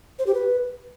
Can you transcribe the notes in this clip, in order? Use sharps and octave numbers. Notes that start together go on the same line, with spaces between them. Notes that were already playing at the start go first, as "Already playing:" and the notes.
C5
G4
B4